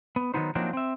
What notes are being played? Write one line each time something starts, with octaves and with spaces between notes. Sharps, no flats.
B3
D#3 F#3 G#3 B3 D#4 C5
F3 F#3 A#3 C4 D4 D#4
C4 E5